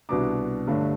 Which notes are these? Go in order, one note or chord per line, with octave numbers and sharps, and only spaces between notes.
C2 B2 B3 D4 D6
G1 G2 D3 A3 D4